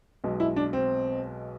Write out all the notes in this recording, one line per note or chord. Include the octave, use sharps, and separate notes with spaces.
B1 B2 G#3
E4
D4
C4